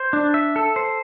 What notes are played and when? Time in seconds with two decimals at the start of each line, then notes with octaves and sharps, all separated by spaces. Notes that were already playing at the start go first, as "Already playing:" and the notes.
Already playing: C5
0.13 D4
0.34 E5
0.56 A4
0.76 C5